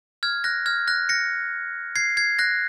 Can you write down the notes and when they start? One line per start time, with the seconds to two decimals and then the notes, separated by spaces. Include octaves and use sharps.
0.23 F6 G#6
0.44 F#6 A#6
0.66 F6 G#6
0.88 F#6 A#6
1.09 A#6 C#7
1.96 G#6 C7
2.17 G#6 C7
2.39 F#6 A#6